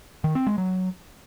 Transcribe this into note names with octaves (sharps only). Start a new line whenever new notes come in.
D#3
C4
G#3
F#3